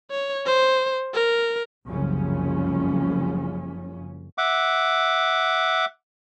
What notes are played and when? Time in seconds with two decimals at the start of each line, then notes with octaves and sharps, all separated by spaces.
0.11 C#5
0.46 C5
1.14 A#4
1.86 F#1 C2 F#2 C#3 F3 C#4
4.38 E5 F#5 D6